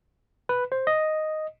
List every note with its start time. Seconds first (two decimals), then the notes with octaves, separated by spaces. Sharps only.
0.49 B4
0.72 C5
0.87 D#5